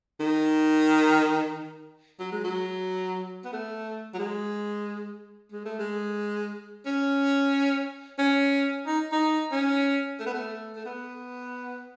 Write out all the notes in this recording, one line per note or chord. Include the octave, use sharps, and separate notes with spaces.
D#3
F#3
G#3
F#3
B3
A3
F#3
G#3
G#3
A3
G#3
C#4
C#4
D#4
D#4
C#4
A3
B3
A3
A3
B3